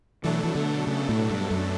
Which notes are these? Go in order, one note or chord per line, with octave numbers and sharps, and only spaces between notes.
B2 E3 F#3 A3 D4 A4
E3
D3
C#3
A2
G2
F#2